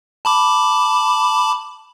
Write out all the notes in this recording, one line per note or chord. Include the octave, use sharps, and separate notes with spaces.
A5 B5 D6